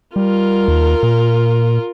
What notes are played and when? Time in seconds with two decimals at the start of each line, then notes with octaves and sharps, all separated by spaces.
0.16 G3 F4 A#4
0.68 D#2
1.03 A#2